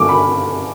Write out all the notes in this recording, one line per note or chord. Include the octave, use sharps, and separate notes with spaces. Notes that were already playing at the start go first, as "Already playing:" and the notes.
Already playing: G2 D3 A3 D6
B5